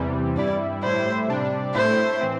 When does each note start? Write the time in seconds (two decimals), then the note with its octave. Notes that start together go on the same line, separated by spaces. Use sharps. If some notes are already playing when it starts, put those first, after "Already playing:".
Already playing: E2 C3 E3 G3
0.36 G2 G3 E4 D5
0.83 A2 G3 E4 C5
1.28 C3 G3 D4
1.75 A2 A3 E4 C5
2.21 E3 C4